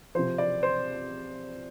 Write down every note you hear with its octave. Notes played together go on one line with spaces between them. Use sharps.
C3 F3 C5
D5
C5